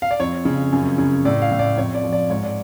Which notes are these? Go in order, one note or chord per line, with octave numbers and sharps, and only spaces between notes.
F5
D5
F2 C#5
C#3
F#2
C#3
A2 D5
F5
A2
D5
F2 C#5
D5
F3
D5
G#2 C#5
D5